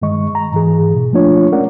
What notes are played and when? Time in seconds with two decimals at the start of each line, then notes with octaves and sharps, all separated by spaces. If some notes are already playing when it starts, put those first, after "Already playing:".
0.02 G2 D#3 G#3 D#5 C#6
0.35 A#5
0.52 G#2 E3 G#4
0.95 B2
1.13 F3 A3 A#3 D4 F4 C#5
1.52 G#3 C#4 A#4 D5 F#5